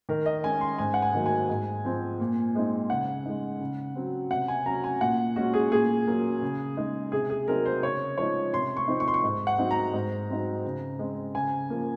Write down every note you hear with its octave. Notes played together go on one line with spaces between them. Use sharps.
D#3 A#4
D#5
G#3 C#4 G#5
C6
G#2 G#5
F#5
G#5
D#3 F#3 A#3
G#5
G#2
F3 C4
A#2
G#3 C4 D#4
C#3 F#5
G#3 D#4
C#3
F#3 C4
C3 F#5
G#5
F#3 C#4 A#5
G#5
A#2 F#5
G#3 C#4 F#4
G#4
A#2 G#4
F#3 A#3 C#4
C#3
G#3 D#4
C3 G#4
G#4
F#3 C4 D#4 A#4
C5
C#3 C#5
F3 G#3 D#4 C#5
C3 C6
C#6
F3 C4 D#4
C#6
C6
C#6
G#2
F#5
F#3 C4 D#4
A#5
G#2
F#3 C4 D#4
C#3
G#3 C4
C#3 G#5
F3 A#3